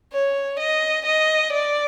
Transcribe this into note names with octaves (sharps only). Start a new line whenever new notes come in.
C#5
D#5
D#5
D5